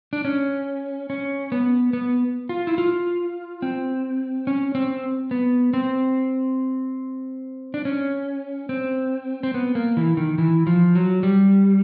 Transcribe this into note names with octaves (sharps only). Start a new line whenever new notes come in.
D4
C#4
C#4
B3
B3
F4
E4
F4
C4
C#4
C4
B3
C4
D4
C#4
C4
C4
B3
A#3
E3
D#3
E3
F3
F#3
G3